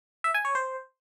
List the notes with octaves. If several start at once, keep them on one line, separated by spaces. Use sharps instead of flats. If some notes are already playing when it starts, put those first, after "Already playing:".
E5
G#5
C#5
C5